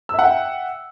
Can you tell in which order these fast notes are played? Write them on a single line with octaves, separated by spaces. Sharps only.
E6 E5 F#5 G5